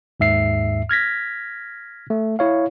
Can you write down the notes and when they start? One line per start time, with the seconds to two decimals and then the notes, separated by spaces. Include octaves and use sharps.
0.20 D#2 G#2 E5 C7
0.89 F6 G#6 A#6 B6
2.10 A3
2.39 E4 C#5 F5